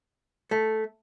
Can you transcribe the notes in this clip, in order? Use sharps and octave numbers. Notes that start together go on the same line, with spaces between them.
A3